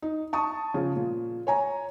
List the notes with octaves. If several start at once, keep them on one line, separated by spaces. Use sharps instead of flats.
D#4
A5 C#6 D#6
C#3 F3
A#2
C#5 G#5 A#5